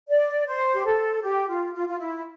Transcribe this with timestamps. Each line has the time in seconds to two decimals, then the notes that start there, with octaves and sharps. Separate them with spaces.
0.10 D5
0.47 C5
0.74 G4
0.85 A4
1.23 G4
1.48 F4
1.74 F4
1.87 F4
1.98 E4